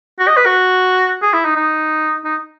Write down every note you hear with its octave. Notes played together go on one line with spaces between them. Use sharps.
F#4
D#5
B4
F#4
G#4
E4
D#4
D#4
D#4